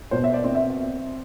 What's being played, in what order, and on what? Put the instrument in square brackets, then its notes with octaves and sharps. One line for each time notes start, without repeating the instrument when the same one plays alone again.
[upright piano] B2 C5
E5
D5
C4
E5